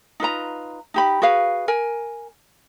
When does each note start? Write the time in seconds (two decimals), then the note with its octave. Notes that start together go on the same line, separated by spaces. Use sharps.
0.20 D#4 F4 B4 A#5
0.94 D#4 G4 B5
1.22 F#4 G#4 B4 F5
1.68 A#4 G#5